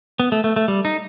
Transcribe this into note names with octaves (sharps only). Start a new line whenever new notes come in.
B3
A3
A3
A3
G3
D#4